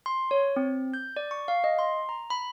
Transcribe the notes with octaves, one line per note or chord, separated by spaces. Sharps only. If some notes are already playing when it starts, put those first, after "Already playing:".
C6
C#5
C4
G6
D5
C#6
F5
D#5
C6
A#5
B5